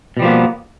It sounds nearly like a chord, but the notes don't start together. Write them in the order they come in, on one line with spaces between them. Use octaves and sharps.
B2 G3 F3 A#3 B3